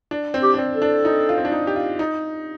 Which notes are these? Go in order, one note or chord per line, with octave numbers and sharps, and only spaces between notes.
D4
C4
G4
D4
C4
A4
D4
D#4
F4
C4
D4
D#4
G4
F4
D#4